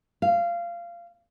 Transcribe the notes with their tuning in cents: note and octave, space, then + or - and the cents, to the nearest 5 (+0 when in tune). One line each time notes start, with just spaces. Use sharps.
F5 -20